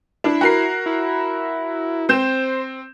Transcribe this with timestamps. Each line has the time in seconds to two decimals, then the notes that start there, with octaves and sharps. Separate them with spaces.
0.24 D4 E4
0.41 F#4 A#4 C7
0.86 E4
2.09 C4 C5 G6 E7